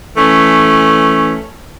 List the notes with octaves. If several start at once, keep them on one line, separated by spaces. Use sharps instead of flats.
E3 A3 C#4